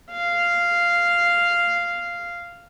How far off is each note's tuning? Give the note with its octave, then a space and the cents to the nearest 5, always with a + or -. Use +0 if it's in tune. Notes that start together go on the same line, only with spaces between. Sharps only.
F5 -5